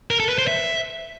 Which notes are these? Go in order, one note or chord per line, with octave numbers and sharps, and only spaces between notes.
A#4
A4
B4
C5
E5